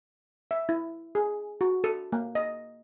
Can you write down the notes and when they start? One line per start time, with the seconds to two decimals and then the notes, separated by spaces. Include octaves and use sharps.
0.51 E5
0.69 E4
1.15 G#4
1.61 F#4
1.84 A4
2.13 A#3
2.35 D#5